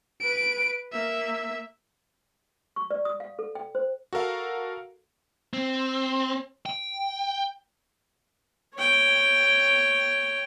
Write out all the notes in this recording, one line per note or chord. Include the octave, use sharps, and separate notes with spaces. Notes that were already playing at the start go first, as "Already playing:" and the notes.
B4 D7
A#3 E5
C#6
D5
D#6
F5
A4
G5
C5
F#4 A4 A#4 F5
C4
G5
C#5 G5